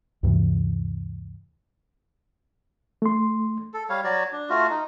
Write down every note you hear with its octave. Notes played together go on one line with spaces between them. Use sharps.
D2 G2 C3 E3
A3 C6
A4
G3 C#5 F5
F#3 F#4 C#5 D5
D4
A3 F4 F#4
D#4